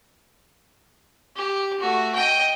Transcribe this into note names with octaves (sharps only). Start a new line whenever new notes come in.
G4
A3 F#4
D#5 G5